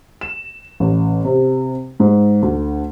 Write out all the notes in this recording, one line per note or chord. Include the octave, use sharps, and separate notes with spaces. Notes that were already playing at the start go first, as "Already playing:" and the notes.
E7
A1
C3
G#2
D2